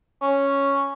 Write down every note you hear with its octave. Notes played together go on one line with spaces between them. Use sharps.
C#4